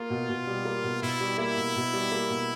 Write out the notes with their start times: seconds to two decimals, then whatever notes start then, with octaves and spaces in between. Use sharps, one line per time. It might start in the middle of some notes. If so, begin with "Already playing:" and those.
Already playing: A#3 F4
0.10 B2
0.29 B2
0.47 G3
0.65 A#3
0.84 B2
1.02 B2 E4
1.20 G3
1.38 A#3 E4
1.57 B2
1.76 B2
1.93 G3
2.12 A#3
2.30 B2